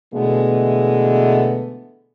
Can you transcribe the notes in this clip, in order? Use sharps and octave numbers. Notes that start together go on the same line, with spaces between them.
B2 D3 E3 G#3 A3 B3